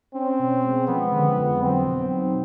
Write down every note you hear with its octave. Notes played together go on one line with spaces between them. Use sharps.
C4 C#4
B2
G#3
F3 B3
D3
F2
F#3 C4
B2
D#4